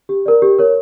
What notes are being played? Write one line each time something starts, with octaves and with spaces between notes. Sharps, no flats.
G4
A#4 D5
G4
A#4 C#5